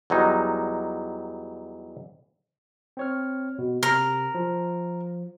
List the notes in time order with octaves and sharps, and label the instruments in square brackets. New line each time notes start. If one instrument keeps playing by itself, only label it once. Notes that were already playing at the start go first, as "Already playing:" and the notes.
[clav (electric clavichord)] E2 F#3 G3 D#4
[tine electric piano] C4 C#5 F6
B2
[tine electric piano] C3 [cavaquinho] A#4
[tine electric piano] F3